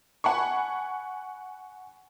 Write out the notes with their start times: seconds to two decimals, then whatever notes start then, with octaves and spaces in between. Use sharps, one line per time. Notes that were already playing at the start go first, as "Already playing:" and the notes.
0.24 F#5 G#5 B5 C#6